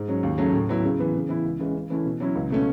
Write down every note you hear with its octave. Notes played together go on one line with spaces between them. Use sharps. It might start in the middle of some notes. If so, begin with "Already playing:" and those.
Already playing: G#2
F#3 C#4
D#2
C#3 F#3 A3 C#4
A2
F#3 B3 E4
C#3
E3 B3
C#3
E3 B3 E4
C#2
C#3 E3 G#3 C#4
C#3
E3 A3 C#4 E4
B2
F#3 C#4 E4
C#2
B2 A3 C#4